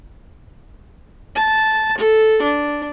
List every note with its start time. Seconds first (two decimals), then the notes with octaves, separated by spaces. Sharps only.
1.36 A5
1.98 A4
2.43 D4